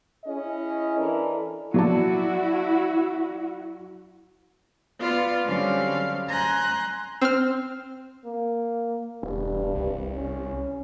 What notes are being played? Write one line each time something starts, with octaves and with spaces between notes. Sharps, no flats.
C#4 E4 G#4 D#5
E3 D4 A4 A#4
F#3 E4 F#4 D5 A5
B3 F4 D5 F5
D3 F#3 G3 C4 C#4 F5
G#5 A#5 C6 F#6 G6
C4 F6
A#3
E1 G2
C2
C#4